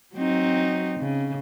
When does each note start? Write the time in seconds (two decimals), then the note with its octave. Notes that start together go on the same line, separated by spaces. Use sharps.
0.15 F#3 C4 D#4
0.99 C#3